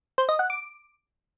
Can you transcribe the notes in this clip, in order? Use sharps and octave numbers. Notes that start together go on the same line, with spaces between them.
C5
D#5
F#5
D6